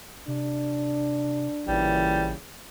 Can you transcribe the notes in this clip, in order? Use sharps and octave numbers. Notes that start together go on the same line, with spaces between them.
C3 D4
A1 A#2 C#3 E3 G3